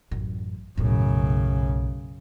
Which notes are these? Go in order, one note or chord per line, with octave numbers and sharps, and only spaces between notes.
A1 F#2
B1 F#2 A2 C#3